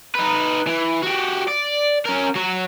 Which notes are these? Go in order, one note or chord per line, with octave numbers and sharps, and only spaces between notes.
D#4 B4
E3
F#4 G4
D5
C#4 A#4
F#3 F#4